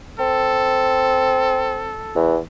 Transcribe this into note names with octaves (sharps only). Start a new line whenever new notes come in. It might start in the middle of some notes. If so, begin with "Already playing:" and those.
C4 A4
E2